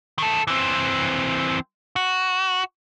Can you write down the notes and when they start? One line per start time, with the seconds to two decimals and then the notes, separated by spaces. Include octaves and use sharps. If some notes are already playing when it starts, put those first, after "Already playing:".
0.19 D#3 A4
0.47 E3 C4
1.96 F#4